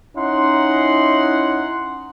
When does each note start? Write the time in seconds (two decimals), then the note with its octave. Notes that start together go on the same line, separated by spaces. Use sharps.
0.17 C#4 D#4 E4 F#5 C6